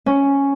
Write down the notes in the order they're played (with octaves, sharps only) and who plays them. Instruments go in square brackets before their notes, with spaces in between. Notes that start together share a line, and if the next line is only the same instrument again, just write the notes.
[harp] C#4